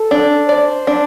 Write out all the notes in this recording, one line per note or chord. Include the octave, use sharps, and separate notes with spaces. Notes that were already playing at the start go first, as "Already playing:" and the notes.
Already playing: A4
D4
C5 D5
D4